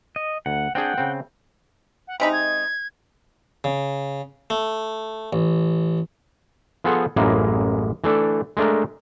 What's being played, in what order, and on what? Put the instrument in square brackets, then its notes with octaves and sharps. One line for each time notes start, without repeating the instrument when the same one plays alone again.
[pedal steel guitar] D#5
[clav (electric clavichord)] D2 [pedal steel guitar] F#5
[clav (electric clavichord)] C4 D4 G#4 [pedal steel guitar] F#5 G5
[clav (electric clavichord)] C#3 C4
[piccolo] F#5
[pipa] C3 G#3 D#4 [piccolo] B5
[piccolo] G#6
[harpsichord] C#3
A3
A1
[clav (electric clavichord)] F3 B3 G#4 A4 C5 F#5
A1 F#2 G#3 A#3 E4 D#5
E3 A3 D4 A4
G#3 A3 D4 A#4